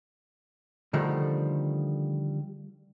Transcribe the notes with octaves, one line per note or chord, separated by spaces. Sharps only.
D3 D#3 F3 G3 A3